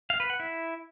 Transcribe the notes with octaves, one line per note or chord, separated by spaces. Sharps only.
F5
B4
F#5
E4